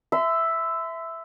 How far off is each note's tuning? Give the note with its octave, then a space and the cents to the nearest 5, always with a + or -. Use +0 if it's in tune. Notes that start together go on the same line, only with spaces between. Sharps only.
E5 +0 C6 -40